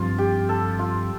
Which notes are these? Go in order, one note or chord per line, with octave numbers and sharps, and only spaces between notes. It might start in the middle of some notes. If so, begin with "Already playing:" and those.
Already playing: G2 F3 C4 F4
G4
A4
F4